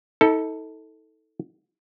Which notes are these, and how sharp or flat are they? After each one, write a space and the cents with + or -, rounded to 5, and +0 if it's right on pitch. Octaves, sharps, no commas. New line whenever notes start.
D#4 +45 A4 +5